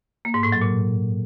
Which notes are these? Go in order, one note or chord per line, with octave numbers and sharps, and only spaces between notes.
A#3
G#2
A2
F#3
A#2